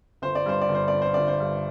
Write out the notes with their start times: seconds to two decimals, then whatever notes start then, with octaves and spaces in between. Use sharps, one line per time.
0.22 G1 C5
0.35 D5
0.46 G2 C5
0.61 D5
0.69 G1
0.75 C5
0.88 D5
0.93 D3
1.02 C5
1.14 G1 D5
1.28 C5
1.40 G2